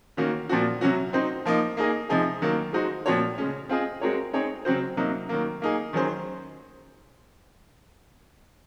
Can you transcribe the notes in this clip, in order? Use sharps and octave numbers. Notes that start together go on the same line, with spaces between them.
D#3 A#3 C#4 F#4
A#2 F3 C4 F#4
C3 F#3 C#4 F#4
C4 D#4 F#4 C5
F3 A#3 D#4
A#3 D#4 G#4 D#5
C3 F3 G#3 D#4 G#4
D#3 F#3 A#3
G#3 D#4 F#4 C5
A#2 F3 C4 F#4 C#5
C#3 G#3 C#4
C4 F4 G#4 D#5
G#3 C4 F#4 A#4 C#5
C4 D#4 G#4 C#5
C#3 F#3 C4 F#4 C5
C3 F#3 A#3 D#4
D#3 F#3 A#3
A#3 D#4 G#4
D#3 F#3 C#4 G#4 C5